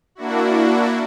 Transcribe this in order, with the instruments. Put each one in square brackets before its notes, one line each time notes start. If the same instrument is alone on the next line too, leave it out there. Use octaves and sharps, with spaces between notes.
[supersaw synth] A#3 D4 E4 F#4